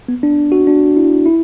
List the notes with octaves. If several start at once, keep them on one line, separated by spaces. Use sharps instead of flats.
B3
D4
F#4
D4
E4
E4